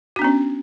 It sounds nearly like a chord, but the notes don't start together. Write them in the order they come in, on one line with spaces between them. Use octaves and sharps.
F#4 D4 B3 C#4